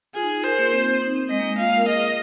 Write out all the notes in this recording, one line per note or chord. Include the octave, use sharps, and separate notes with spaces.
F4 G#4
D#4
F4
A#4 C5
A#3
C4
C4
D#4
C4
G#3 D#5
A#3
G#3
F4 F5
A#4
G#4 D#5